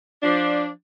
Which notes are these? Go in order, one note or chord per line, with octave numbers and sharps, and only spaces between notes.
F3 D4